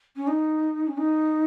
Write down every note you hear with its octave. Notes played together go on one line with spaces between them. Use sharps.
C#4
D#4
C#4
D#4